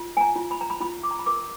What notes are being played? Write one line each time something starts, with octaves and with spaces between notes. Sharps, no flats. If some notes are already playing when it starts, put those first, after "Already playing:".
Already playing: F4
G#5
A#5
F4
B5
A#5
B5
F4 B5
D6
A#5
B5
A#4 D6